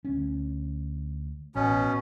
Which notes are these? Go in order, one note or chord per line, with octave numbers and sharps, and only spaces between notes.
D2 C#4
A1 B2 C#4